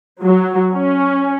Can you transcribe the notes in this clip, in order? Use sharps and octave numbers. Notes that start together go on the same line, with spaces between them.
F#3
C#4